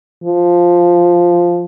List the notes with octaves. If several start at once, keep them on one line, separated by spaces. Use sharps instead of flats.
F3